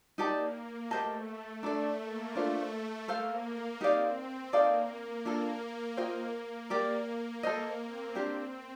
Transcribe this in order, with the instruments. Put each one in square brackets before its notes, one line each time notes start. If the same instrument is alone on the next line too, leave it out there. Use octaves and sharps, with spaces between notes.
[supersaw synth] A#3 [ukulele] D#4 G4 D5 A5
[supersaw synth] A#3
[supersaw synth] A3 [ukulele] G4 C5 D#5 A5
[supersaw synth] A3 [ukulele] D4 A4 D5
[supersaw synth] A#3
[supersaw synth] A3 [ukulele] D4 F4 C5
[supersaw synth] A#3 [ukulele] A4 C5 F5
[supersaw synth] C4 [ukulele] D#4 G4 D5 F5
[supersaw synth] A#3 [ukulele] D#4 A4 D5 F5
[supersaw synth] A#3
[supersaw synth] A#3 [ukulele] D4 F4 A4
[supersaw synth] A#3 [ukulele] F4 C5 D#5 G5
[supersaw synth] A#3
[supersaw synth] A#3 [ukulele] G4 A#4 D5
[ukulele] A4 C5 D#5
[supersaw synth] C4
[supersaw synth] C4 [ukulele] D4 G4 C5